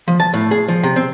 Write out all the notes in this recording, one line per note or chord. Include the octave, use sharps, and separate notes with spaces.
F3
A5
A2
G#4
F3
C3
C4